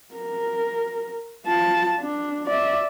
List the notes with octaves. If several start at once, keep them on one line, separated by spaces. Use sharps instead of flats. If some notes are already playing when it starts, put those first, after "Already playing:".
A#4
F4 A5
D4
D5 E5